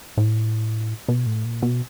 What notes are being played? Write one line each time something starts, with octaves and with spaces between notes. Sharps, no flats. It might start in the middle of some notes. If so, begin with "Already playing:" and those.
A2
B2
A2
A#2
B2